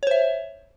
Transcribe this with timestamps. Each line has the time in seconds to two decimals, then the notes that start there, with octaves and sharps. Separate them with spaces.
0.03 C#5
0.07 C5
0.11 E5